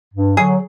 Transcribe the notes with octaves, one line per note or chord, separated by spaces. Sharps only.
G2
D3 F#3 G#4